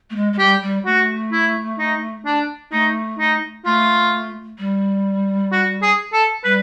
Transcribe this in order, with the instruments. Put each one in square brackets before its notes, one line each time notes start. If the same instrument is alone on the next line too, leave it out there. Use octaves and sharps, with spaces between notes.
[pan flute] A3
G#3
G#3
[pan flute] G3 [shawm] G4
[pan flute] G3
[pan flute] A3 [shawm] F#4
[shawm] E4
D#4
D4
[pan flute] A3 [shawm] D#4
[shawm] D#4
[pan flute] A3 [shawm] F4
[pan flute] G3
[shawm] F#4
G#4
A4
[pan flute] G3 [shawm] B4